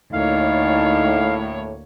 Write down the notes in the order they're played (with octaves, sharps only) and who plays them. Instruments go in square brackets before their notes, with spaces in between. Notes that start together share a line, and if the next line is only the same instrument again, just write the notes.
[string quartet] D2 A#3 C#5 [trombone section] A2 [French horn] D#4 [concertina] F5